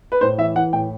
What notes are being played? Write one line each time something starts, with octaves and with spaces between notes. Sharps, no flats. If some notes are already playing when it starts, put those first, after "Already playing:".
B4
A2 C5
E3 E5
E3 F#5
A2 G5